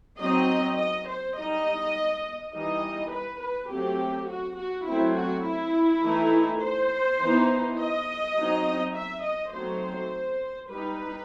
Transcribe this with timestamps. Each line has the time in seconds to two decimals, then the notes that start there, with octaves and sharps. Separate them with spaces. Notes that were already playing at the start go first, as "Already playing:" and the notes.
0.20 F#3 C4 D#4 D#5
0.79 D#5
1.08 C5
1.37 G3 D#4 D#5
2.53 E3 G3 D#4 D#5
3.12 B4
3.41 B4
3.70 F#3 A3 C4 G4
4.28 F#4
4.57 F#4
4.86 F#3 A3 C4 E4
5.16 F#4
5.45 E4
6.03 E3 A3 D#4
6.61 C5
7.20 E3 B3 D#4
7.78 D#5
8.36 F#3 C4 D#4
8.95 E5
9.23 D#5
9.53 F#3 A3 C4 D#4 C5
10.70 G3 D#4 B4